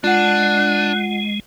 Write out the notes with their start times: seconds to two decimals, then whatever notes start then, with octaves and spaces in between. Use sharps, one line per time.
0.04 G#3 D4 F4 F#5 F#6